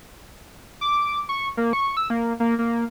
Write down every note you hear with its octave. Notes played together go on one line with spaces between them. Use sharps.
D6
C#6
A#3
C#6
E6
A#3
A#3
A#3